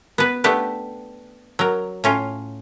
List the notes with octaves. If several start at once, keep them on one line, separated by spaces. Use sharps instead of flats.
B3 B4
A3 B3 D4 G4
F#3 A#4
A2 C#4 F4